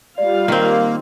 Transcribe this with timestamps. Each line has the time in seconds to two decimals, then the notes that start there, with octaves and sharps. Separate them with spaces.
0.18 G3 F4 D5 F5
0.48 D#3 A#3 C4